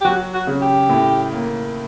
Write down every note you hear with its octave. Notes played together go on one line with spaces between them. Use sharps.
G4
F#3 F#4
F#4
C#3
G4
A2
A#3